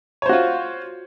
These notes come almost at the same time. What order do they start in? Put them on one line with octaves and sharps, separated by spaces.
C#5 C5 F#4 F4